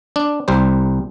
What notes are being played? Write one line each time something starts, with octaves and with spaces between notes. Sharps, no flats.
D4
C2 G3 C5